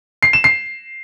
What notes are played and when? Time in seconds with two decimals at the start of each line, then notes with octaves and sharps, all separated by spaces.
0.23 C7
0.33 E7
0.44 C7